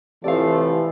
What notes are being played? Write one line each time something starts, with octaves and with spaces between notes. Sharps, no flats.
A2 C3 E3 F3 A3 D5 F5